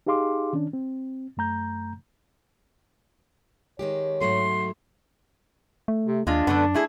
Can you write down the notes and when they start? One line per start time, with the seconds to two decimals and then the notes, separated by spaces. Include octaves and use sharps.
0.06 D#4 G4 G#4 F5 C6 D6
0.53 D#3 C#4 D4
0.73 C4
1.37 F#2 A3 A#5 G6
3.79 D#3 G#3 G4 C#5
4.21 G#2 F#3 A3 C6
5.88 A3
6.06 C3
6.27 D#2 G#3 D4 F4
6.47 F#2 D3 A3 B3
6.74 A3 E4 G#4